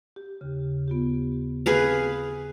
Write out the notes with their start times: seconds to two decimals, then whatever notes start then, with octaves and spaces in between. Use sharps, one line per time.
0.16 G4
0.41 D#2 C#3
0.88 B3 F4 G4
1.66 C4 G#4 B4 F5 G6